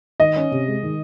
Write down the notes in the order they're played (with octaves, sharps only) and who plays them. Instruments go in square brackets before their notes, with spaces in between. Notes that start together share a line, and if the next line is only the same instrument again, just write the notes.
[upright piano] D#3 [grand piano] D#5
[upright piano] C#4
C3
G#3
D#3